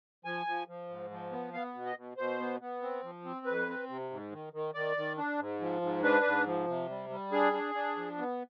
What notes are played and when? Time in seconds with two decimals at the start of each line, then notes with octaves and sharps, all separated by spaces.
0.25 F3 G#5
0.46 F3
0.68 F3
0.89 G#2
1.11 F3
1.32 B3
1.53 B3 F5
1.74 B2
1.86 D#5
1.96 B2
2.17 B2 C5
2.40 B3
2.61 B3
2.82 C4
3.03 F3
3.25 C4
3.46 F2 B4
3.68 C4
3.89 C3
4.11 G#2
4.32 D#3
4.53 D#3
4.74 D#3 D5
4.97 D#3
5.17 D4
5.39 G#2
5.60 F3
5.82 G#2
6.04 D4 B4
6.25 G#2
6.46 F3
6.67 C3
6.89 G3
7.10 G3
7.32 D4 G#4
7.53 D4
7.75 D4
7.96 F3
8.18 B3